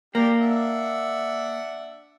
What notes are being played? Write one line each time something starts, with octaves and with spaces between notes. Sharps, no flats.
A#3 D4 G4
D4 E5 F#5